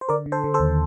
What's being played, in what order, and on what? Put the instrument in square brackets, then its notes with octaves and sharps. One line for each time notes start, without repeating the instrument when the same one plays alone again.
[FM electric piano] C5
D3 A#4 D5
D3
A4 C5
D3
A4 C5
D#2